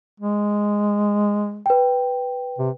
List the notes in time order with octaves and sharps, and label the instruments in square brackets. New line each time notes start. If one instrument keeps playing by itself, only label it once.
[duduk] G#3
[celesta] B4 G5
[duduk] C3